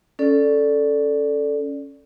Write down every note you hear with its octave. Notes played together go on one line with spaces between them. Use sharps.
C#4 A4 D5